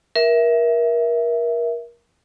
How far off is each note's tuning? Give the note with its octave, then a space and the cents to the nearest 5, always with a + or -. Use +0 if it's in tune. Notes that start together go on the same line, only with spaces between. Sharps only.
A#4 +25 E5 +0